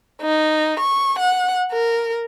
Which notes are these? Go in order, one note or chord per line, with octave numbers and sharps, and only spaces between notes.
D#4
C#6
F#5
A#4